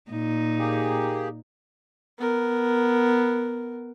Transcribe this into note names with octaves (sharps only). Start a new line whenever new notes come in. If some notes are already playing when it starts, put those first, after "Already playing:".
A#2 D#4
A#3 G4 G#4
B3 A#4